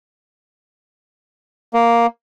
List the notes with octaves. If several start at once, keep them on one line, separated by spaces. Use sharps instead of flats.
A#3